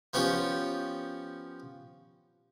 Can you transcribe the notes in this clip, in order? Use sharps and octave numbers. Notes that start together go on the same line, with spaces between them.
F3 B3 C#4 F4 G4